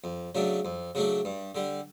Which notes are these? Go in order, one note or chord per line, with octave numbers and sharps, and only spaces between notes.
F2
C#3 F#3 A3 D4
F2
C#3 F#3 A3 D4
G2
D3 G3